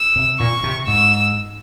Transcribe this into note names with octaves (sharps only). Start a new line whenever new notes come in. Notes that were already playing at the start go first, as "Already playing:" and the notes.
Already playing: E6
C3
A#2 C#6
C3
G#2 E6